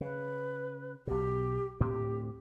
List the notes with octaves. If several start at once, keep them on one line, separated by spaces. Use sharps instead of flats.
C#3 B4
B1 B2 G4
D2 A2 C4 G4